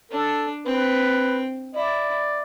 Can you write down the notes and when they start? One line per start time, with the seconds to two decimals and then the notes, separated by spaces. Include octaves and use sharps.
0.11 D4 A4
0.66 C4 B4
1.75 E4 D5